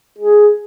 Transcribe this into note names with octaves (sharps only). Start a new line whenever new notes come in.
G#4